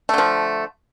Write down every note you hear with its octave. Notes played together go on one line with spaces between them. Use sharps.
D3 F3 A3